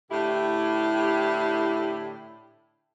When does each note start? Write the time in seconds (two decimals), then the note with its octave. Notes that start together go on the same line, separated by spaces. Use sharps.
0.11 A2 D3 E4 G4